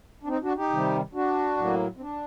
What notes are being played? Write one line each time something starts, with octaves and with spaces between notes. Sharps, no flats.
D4
C4 D#4
D4 F#4
D#4 G4
C3 D#3 G3
D4 F#4
A2 F#3 A#3
C4
D4